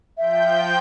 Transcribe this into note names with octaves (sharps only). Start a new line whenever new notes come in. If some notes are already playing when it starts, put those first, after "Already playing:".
F3 E5 G5 G6